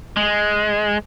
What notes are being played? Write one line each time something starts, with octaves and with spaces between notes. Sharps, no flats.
G#3